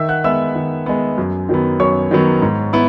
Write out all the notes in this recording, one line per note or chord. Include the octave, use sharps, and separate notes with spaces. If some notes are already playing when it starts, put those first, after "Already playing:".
Already playing: D#3 E5 E6
F#5 F#6
G#3 B3 E5 E6
D#3
G#3 B3
F#2
D#3 F#3 B3
F#2 C#5 C#6
D#3 F#3 B3
G#2
B3 E4